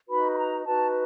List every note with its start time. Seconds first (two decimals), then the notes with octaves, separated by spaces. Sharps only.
0.08 D#4 F#4 B4 B5
0.33 B5
0.37 A#5
0.66 D#4 F#4 B4 A5